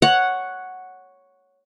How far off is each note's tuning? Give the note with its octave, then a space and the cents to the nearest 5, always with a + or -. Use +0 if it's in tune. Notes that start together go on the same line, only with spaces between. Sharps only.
C#5 +0 F#5 +0